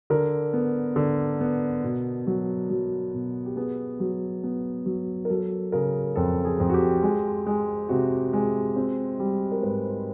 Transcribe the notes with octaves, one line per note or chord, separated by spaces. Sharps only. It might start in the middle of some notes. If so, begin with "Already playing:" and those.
D3 A#4
B3
D3
B3
B2
F#3
F#3
B2
G4
B3 G#4
F#3
B3
F#3
A#4
F#3 A4
C#3 A#4
F2 A4
G#4
F2
F#4
G4
G#3
G#3
C3 F#4
G#3
C4
G3
A#4
G#2 B4